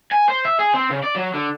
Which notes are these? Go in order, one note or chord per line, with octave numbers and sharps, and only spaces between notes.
G#5
C5
E5
G#4
C4
C#3
D5
F#3
D3